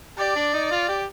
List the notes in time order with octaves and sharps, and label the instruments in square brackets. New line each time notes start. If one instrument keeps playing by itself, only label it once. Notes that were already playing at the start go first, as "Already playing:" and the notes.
[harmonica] G4 [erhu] D5
[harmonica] D4
D#4
F4
G4